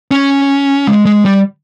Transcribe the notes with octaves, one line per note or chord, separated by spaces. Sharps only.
C#4
G#3
G#3
G3